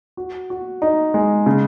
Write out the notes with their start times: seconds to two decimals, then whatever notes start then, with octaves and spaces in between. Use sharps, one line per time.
0.17 F#4
0.50 F#4
0.82 D#4
1.14 G#3
1.46 C#3